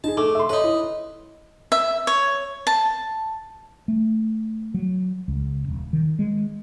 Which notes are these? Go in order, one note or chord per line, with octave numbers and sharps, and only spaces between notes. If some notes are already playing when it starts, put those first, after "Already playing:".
D#4 G#4 A5
A3 D6
E5 C6
D#4 A4 B4 C#5
E4
E5
C#5
A5
A3
F#3
C#2
E1
D#3
G#3